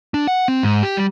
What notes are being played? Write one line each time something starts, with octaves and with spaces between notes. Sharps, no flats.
D4
F#5
C4
G#2
G4
G3